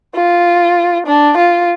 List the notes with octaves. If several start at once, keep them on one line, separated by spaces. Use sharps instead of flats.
F4
D4
F4